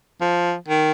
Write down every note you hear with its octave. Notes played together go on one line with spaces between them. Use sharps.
F3
D#3